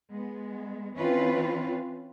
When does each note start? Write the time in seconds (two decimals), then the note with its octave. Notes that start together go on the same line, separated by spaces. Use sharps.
0.13 G#3 B3
0.97 E3 C4 C#4 F4 B4